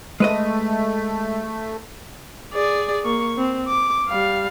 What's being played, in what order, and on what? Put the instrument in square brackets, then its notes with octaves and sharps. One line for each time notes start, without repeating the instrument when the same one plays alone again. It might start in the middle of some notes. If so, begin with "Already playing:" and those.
[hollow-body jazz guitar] G#3 B4 D#5 [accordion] A3
[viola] G#4 D5
A#3 C#6
C4
D6
G3 F5